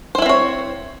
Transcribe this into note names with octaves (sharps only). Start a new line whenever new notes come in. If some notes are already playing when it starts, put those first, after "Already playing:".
C4 E4 C5 C#5 E5